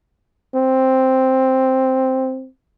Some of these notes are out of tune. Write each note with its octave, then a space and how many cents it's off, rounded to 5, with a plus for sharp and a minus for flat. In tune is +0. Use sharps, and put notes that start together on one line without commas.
C4 +0